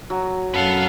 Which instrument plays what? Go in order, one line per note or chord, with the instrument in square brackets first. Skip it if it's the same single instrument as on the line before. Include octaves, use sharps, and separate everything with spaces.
[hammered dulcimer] F#3
[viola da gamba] F#2 [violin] A4 F5 [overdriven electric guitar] B4 F#5